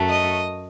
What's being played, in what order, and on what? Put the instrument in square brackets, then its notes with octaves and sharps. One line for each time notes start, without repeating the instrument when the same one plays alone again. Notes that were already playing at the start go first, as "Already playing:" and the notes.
Already playing: [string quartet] F#2 F#3 A3
D#5